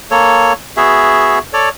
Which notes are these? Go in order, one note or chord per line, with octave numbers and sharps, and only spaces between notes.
A#3 A4 C#5
B3 F#4 G#4 E5
A4 C#5 D5